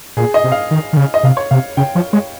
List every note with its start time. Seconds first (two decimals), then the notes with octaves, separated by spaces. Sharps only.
0.17 A#2 G#4
0.34 D#5
0.44 C3
0.52 F5
0.71 D#3
0.93 D#3
0.97 C#3
1.14 D#5
1.23 C3 F5
1.37 C#5
1.51 C3 F5
1.77 C#3 G5
1.95 F3 C#5
2.13 G#3 C#5